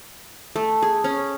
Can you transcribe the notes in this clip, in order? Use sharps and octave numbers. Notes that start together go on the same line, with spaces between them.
A3
G#4
C#4